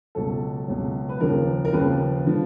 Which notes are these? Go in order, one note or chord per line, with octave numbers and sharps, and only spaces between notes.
C#2 B2 F#3 A4
C#2 B2 F#3
B4
D#2 C#3 F3 A#4
A#4
D#2 C#3 F3 B4
D3 F3